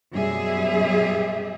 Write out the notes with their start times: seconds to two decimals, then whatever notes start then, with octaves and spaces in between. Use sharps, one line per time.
0.13 F#2 B2 G3 G#4 E5